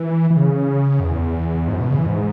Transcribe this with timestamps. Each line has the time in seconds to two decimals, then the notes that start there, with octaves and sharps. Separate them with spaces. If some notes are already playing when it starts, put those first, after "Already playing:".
Already playing: E3
0.30 E3
0.37 C#3
1.00 F#2
1.04 E2
1.68 G#2
1.73 F#2
1.80 B2
1.90 C#3
1.98 E3
2.07 G#2